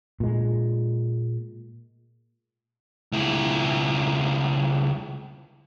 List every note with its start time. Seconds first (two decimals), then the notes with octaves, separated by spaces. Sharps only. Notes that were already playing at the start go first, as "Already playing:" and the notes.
0.20 A#2 G#3
3.12 C#2 E4